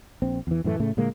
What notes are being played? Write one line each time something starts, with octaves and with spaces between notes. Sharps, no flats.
A#1 C4
E2 E3
F#2 A2 E3 A3
A2 C#3 A3
A#2 D3 G#3 A#3